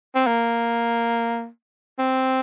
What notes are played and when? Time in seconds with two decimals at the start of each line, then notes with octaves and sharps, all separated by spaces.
0.15 C4
0.27 A#3
1.99 C4